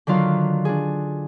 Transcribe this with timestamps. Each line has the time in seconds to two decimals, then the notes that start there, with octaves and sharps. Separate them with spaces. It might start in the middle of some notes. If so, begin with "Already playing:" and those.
0.07 D3 D#3 F#3 F4 F5
0.65 D4 G#4